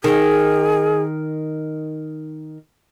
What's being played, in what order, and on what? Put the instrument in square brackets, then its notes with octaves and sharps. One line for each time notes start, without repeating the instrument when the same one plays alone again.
[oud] D#3 [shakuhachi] G#4